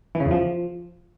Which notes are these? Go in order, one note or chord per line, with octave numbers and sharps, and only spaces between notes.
E3
C#3
E2
F3